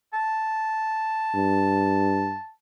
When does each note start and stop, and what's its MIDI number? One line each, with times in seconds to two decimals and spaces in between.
0.13 2.50 81
1.35 2.36 43